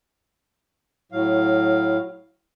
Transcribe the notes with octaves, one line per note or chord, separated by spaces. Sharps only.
A2 F#3 F5